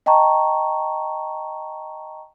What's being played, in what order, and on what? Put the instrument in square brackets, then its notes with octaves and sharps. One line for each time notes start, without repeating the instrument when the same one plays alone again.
[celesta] D#5 G5 A5 A#5 C#6